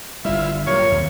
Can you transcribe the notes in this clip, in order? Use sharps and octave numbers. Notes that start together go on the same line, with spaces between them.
G1 G3 E4 F4 E5
G2 A#2 F#3 F4 C#5
D#2 C3